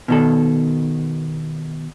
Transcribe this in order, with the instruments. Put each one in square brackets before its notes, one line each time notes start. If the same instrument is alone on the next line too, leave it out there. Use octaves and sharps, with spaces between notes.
[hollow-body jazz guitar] B2 D#3 A4